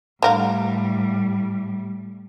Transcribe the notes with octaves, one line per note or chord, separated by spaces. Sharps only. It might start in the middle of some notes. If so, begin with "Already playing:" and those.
A2 D3 G3 A#4 F5